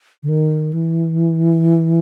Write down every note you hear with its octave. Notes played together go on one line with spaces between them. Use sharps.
D3
D#3
E3